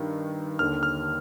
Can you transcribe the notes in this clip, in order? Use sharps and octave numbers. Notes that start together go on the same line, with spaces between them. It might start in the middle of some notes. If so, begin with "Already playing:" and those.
Already playing: G2 D#3
D#2 D3 F6
F6